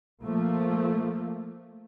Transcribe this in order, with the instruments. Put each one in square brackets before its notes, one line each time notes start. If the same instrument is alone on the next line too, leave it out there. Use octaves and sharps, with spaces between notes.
[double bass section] F3 A3 A#3